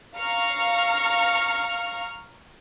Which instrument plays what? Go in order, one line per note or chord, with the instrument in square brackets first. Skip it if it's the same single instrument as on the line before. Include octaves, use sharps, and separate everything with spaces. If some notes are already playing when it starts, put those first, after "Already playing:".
[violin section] F5 A#5 C#6 F6 C#7